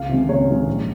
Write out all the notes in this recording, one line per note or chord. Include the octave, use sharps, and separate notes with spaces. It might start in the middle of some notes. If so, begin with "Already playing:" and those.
Already playing: C#2 F5
C3 D#3 G#3
C#2 C#5
C3 D#3 G#3
A#1